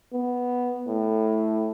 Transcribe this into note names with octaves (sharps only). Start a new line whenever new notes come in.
B3
A2